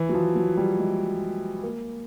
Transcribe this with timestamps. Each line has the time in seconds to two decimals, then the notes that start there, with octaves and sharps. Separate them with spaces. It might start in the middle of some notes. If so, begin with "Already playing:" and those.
Already playing: E3
0.09 F#3
0.14 F3
0.36 F#3
0.57 G3
0.79 G#3
1.63 A#3